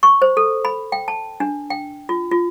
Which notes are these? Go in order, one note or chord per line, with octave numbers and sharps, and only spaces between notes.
C#6
C5
A4
B5
G5
A5
D4
G5
F4
F4